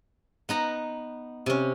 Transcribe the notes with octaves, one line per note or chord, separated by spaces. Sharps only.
B3 D#4 A#5
C3 C#4